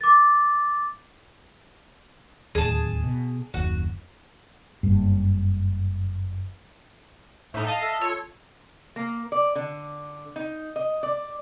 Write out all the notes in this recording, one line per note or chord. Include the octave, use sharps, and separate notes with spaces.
D6 A6
D1 D#2 G#4 A5
B2
F#1 D#2 F#4
F#1 G2
A2 D#4 E5
D#5 F5 A5
A4 E5
F4 C#5
A#3
D5
D3
D#4
D#5
D5